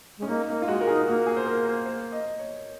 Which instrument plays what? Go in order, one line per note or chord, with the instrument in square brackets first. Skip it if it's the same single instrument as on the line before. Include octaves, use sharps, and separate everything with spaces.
[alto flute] G#3 [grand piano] C#4
[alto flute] A#3 [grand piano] D#4
[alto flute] A#3 [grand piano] D#4
[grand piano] F4
[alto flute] G#3 [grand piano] F#4
[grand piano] A#4
[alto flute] D#4 [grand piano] G#4
[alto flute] A#3 [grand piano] F#4
[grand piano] G#4
C5
A#4
C5
C5
D#5
C#5